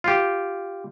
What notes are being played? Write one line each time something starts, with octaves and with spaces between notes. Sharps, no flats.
F4 G4